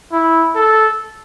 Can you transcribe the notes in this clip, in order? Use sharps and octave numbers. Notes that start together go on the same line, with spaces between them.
E4
A4